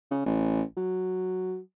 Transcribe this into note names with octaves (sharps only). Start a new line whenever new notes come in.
C#3
A1
F#3